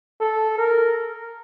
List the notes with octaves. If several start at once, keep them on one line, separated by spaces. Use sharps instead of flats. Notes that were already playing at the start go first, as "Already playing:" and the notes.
A4
A#4